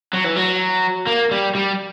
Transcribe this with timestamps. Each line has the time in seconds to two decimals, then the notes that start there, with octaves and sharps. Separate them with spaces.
0.14 F#3
0.25 E3
0.36 F#3
1.07 A#3
1.31 G3
1.55 G3